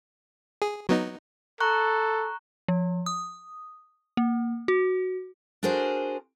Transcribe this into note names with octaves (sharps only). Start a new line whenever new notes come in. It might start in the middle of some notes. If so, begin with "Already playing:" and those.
G#4
F#3 B3 D#4
A4 A#5 C#6 F#6
F3
D#6
A#3
F#4
D4 F#4 G#4 A#4 C5